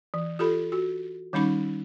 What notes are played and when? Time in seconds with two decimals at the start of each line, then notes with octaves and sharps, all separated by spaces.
0.14 E3
0.39 F4 G4 A4 B5
0.72 F#4
1.33 D#3 G3 C#4 D#4 B5